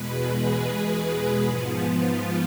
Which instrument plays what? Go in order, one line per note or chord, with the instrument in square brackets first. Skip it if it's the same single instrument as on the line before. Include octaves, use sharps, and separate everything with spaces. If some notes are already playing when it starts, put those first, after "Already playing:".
Already playing: [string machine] E2 B2 G#3 B4
G#4
G#4
G#2 F3 B3
F4